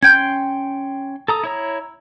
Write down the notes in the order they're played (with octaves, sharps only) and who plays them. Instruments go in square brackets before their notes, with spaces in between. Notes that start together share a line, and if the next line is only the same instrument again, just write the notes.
[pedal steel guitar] C#4 G5 C6 [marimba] G6 G#6
[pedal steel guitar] A4 A#5 D#6
E4 C#5 A#5